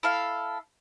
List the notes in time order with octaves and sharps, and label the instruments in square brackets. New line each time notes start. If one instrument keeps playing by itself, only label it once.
[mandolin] E4 A4 F5